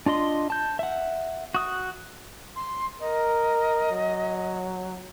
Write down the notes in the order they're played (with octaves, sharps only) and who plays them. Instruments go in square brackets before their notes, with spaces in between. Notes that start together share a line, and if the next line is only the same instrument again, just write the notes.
[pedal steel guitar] D4 F4 D#5 C6
A5 G6
E5 F#5
F#4 D#6 F#6
[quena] C6
[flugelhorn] A#4 [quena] D#5
[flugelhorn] F#3